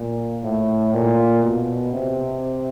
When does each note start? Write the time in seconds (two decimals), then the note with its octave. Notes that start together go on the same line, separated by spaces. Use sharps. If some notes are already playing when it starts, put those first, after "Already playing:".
Already playing: A#2
0.44 A2
0.94 A#2
1.43 B2
1.93 C3